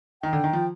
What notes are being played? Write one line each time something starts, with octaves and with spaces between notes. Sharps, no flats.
D#3 G5
D3
D#3
F3